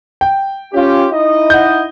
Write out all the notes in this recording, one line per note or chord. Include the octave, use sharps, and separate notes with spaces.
G5
C#4 F4 G4
D#4 E4 D#5
F#5 G6